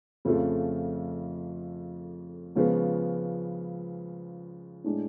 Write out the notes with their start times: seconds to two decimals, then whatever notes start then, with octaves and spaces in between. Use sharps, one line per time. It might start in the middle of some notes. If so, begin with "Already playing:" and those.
0.25 F2 C#3 F3 A3 F4
2.55 C#2 C#3 F3 B3
4.84 A2 G#3 D4